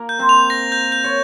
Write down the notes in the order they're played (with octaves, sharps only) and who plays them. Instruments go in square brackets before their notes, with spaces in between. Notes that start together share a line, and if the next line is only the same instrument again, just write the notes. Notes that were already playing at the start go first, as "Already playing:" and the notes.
Already playing: [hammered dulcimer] A#3 A#4
[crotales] G6
[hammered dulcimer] C4 C5
[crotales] F7
A#6
G6
G6
[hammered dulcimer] C#5